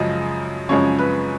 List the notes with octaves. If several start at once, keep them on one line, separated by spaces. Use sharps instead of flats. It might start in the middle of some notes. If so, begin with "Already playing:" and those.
Already playing: F#2 C#3 F3 G#3 D#5
F#2 C#3 F3 G#3 C#5
B4